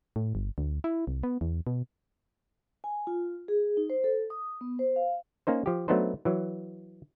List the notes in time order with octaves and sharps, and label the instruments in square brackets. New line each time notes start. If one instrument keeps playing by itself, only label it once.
[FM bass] A2
G1
D2
E4
C2
B3
E2
B2
[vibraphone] G#5
F4
G#4
D#4
C5
A4
D#6
B3
C5
F5
[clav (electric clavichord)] A#3 C#4 D#4 C5
F3 G4
F#3 A3 B3 D4 D#4 C5
E3 F#3